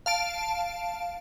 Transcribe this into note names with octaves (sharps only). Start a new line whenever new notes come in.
F5 A5 D7